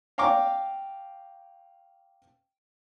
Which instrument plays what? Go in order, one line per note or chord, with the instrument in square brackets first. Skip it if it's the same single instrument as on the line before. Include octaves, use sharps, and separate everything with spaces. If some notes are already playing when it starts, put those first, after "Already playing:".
[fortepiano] F5 G5 A#5 C#6 D6 F6